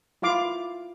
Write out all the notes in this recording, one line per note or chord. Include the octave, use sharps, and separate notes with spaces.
E4 F4 F5 D6